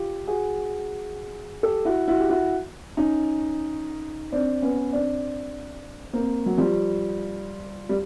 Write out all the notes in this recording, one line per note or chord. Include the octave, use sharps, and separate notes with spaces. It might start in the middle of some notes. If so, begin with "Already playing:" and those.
Already playing: F4 G4
F#4 G#4
G4 A4
E4 F#4
E4 F#4
G4
E4 F#4
C#4 D#4
C4 D4
B3 C#4
C4 D4
A#3 C4
F#3
F3 G3
G3